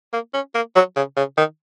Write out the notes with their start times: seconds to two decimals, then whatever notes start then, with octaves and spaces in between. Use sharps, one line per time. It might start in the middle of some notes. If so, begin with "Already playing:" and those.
0.13 A#3
0.34 C#4
0.55 A#3
0.76 F#3
0.96 C#3
1.16 C#3
1.37 D#3